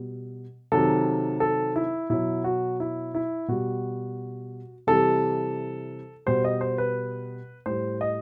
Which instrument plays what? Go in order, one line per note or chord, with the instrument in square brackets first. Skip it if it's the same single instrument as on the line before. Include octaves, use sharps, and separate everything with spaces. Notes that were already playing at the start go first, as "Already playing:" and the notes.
Already playing: [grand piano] B2 G3
C3 D#3 F#3 A4
A4
E4
B2 F#3 E4
F#4
E4
E4
B2 G3 F#4
C3 E3 G3 A4
B2 G3 C5
D#5
C5
B4
A2 G3 C5
D#5